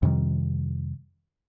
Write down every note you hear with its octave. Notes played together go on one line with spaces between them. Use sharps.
F2 C3 D#3 G3